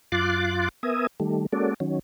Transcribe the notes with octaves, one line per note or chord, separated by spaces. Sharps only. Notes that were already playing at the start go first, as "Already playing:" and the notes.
F#2 F4 C6 D6 F#6 A6
B3 A#4 E5 G#5 D#6
D#3 G3 A3
G#3 A#3 C#4 F#4 A4 D5
D#3 F#3 C#4